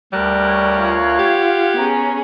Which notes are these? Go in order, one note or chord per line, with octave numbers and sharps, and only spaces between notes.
D2 G3 A#4 F#6
C#5
F4 F5
G4 F#5 G#6
B3 C#4 G#4 A#5